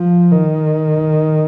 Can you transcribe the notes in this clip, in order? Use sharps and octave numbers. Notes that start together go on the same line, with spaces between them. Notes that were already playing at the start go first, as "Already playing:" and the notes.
Already playing: F3
D#3